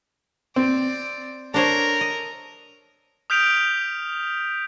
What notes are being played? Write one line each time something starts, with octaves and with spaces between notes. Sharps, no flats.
C4 D5
D4 A4 A#4 C5 C#5
D#5
D#6 F6 G6 B6 D7 F7